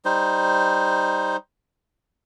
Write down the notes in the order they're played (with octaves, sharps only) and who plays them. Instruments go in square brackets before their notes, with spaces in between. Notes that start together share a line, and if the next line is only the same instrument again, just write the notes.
[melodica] G3 D#4 C5